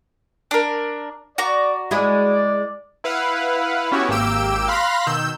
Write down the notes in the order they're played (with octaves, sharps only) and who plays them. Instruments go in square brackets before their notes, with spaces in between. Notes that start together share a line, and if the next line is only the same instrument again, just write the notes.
[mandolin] D4 A#4
[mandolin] F#4 A#5 [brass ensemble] D5
[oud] G#3 E4 G#4 [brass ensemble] D5
[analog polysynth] E4 B4 F5 F#5
B3 C#4 E4 F#4 G4 C#5
G#1 A#3 G4 G5 E6 D7
F5 B5 C6 F#6 A#6
B2 D#3 E6 G6